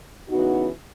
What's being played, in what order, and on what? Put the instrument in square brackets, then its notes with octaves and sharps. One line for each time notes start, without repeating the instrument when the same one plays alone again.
[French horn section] C#3 E3 B3 D#4 F#4